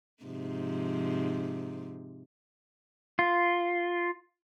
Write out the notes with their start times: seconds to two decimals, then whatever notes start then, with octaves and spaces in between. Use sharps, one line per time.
0.23 G#2 C3 F3
3.19 F4